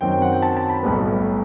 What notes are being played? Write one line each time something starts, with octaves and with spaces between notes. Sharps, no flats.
F#2 D#3 F#3 C4 G5
G5
F#5
G5
A5
A5
B5
B1 A2 G3 B3